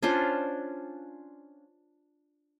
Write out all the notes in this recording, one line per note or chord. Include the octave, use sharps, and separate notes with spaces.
C#4 D4 F4 C5